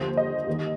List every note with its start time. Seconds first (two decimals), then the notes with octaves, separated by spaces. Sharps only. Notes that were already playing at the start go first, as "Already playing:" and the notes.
Already playing: D#2 D3 F3 C5
0.17 D#5
0.47 D#2 D#3